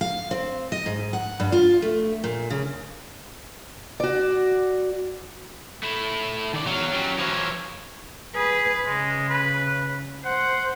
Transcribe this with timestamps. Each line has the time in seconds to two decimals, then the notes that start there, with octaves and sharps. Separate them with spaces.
0.01 F5
0.31 C4
0.72 D#5
0.86 G#2
1.13 F#5
1.40 G2
1.52 F4
1.82 A3
2.24 A#2
2.50 C#3
4.00 F#4 D5
5.83 A3 E4
6.53 D#3 D5
6.67 E2 F#3 F5
6.93 G3 C#4
7.18 E3 F3 A#4 C#5
8.35 G#4 B4
8.86 C#3 G#3
9.29 B4
10.25 C5 F#5